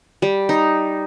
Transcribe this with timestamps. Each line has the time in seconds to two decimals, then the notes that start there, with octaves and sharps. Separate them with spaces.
0.22 G3
0.49 D#4